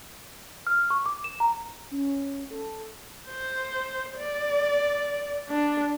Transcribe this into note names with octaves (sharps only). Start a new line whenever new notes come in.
F6
C#6
D6
E7
A#5
C#4
A4
C5
D5
D4